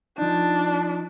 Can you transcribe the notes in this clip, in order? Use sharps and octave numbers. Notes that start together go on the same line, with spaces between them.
F3 D4 D#4